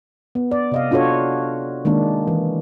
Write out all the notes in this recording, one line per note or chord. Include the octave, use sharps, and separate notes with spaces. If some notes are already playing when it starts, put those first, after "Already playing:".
B3
D5
C3 D#5 F5
D4 F4 F#4 A4 C#5
D#3 G#3 A#3 D4
E3